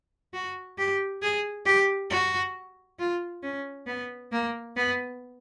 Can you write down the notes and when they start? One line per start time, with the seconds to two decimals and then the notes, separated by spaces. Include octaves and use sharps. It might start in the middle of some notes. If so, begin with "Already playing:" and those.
0.34 F#4
0.78 G4
1.22 G#4
1.66 G4
2.11 F#4
2.99 F4
3.43 C#4
3.87 B3
4.32 A#3
4.76 B3